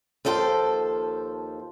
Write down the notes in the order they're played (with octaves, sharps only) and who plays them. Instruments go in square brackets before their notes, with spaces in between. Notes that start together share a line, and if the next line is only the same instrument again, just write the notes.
[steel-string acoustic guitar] D#2 F3 A4 C5 G5